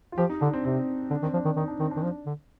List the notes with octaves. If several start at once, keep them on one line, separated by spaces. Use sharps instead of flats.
F4
F3 G4
D#4
D3 D4
C4
C3 C4
D3 D4
D#3 C4
F3 D4
D#3
D#3 D#4
D4
D#3 C4
D4
D#3
F3
D3